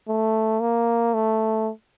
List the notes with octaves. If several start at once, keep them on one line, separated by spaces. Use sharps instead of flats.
A3
A#3
A3